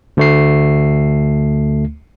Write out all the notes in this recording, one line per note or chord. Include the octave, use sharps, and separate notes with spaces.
D2 A3 C7